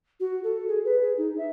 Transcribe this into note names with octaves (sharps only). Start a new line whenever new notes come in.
F#4
A4
G#4
B4
G#4
D#4
E5